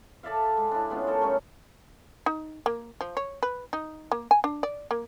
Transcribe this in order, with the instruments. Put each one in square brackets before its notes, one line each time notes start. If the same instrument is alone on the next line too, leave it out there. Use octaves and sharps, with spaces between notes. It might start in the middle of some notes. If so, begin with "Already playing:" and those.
[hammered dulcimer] A4 D5 E5 F5
G#3
D4 E4
G#3 B3 C#4 F4
D#4 A4 A#4 C#6
G3 A3 C#4 C#5
[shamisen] D#4
A#3
F3
C#5
B4
D#4
A#3
G#5
D4
D5
A#3